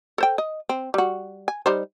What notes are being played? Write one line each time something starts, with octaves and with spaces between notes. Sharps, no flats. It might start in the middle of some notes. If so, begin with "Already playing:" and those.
A4 C5 G5
D#5
C4
G3 F#4
G#5
G3 D#4 C5